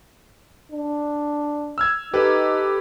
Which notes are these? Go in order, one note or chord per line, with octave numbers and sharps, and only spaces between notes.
D4
E6 F6 G#6
D#4 G4 A4 B4